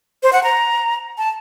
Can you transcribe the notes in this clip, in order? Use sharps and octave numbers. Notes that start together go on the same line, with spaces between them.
C5
F#5
A#5
A5